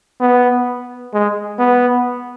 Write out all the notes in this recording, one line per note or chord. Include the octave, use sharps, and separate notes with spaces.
B3
G#3
B3